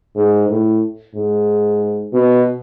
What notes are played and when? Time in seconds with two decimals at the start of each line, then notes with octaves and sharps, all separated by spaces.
0.16 G#2
0.49 A2
1.15 G#2
2.13 B2